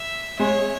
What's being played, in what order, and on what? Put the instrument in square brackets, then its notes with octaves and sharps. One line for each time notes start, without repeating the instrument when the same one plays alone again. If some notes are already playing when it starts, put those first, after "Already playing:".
Already playing: [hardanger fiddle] E5
[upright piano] G#3 [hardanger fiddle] C#5